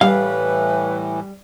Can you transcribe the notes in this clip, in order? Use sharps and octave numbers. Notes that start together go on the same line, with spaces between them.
A2 E3 G3 B4 F5